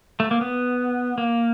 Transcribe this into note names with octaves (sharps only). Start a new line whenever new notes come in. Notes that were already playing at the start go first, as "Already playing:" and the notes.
A3
A#3
B3
A#3